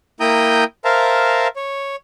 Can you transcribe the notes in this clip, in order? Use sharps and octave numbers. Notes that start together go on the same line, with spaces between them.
A#3 E4 G5 A#5 D#6 G6
A#4 C5 E5 F5 A5 A#5
C#5